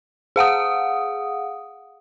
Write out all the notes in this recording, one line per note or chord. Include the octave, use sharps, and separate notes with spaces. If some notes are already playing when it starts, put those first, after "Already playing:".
G#4 F5 F#5 D#6